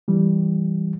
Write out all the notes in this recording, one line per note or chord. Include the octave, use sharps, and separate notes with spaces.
E3 G3